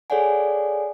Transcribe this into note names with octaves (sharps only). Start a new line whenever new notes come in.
G#4 A4 C#5 D5 F#5 G#5